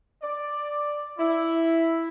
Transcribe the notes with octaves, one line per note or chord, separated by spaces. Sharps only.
D5
E4